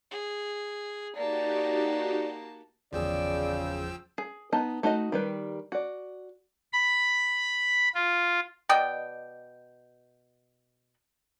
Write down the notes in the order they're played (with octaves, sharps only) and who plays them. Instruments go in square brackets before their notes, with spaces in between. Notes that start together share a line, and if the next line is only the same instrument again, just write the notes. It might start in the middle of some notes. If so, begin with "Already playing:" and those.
[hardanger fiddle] G#4
[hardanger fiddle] A#3 A5 [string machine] D#4 F#4 G4 [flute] D5
[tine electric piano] G1 E2 G#4 [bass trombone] C#3 [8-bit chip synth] F3 G5 E6 [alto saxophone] D5
[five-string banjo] G#4
B3 D#4 D#5 A5
A3 D#4 F#4 C#5 D#5
D#3 G3 B4
F#4 D5
[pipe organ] B5
F4
[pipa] B2 D5 D#5 G5